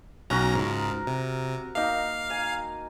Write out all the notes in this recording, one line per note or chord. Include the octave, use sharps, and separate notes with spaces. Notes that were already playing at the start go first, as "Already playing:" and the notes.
B1 C#4 F#4 A#4 A#5
C#2 G#2
C3
A#3 D#4 F5
G#5